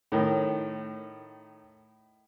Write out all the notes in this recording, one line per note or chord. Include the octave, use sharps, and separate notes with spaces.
A2 D#3